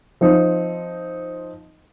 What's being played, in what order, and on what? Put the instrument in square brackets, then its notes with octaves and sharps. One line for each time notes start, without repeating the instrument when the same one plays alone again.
[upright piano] F3 C4 D#4